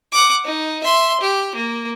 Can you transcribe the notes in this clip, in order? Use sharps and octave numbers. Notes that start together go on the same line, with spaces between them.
F#5 D6
D#4
E5 C6
G4
A#3